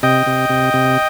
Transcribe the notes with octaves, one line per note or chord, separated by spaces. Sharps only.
C3 D#5 G5
C3
C3
C3